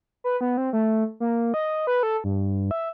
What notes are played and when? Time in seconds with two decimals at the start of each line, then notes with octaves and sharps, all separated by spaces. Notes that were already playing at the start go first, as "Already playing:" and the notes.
0.24 B4
0.41 B3
0.57 C4
0.73 A3
1.20 A#3
1.54 D#5
1.87 B4
2.03 A4
2.24 G2
2.71 E5